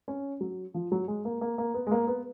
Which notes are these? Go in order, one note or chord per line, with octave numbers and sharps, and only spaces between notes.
C#4
F#3
F3
F#3
G#3
A#3
A#3
A#3
B3
G#3
A#3
B3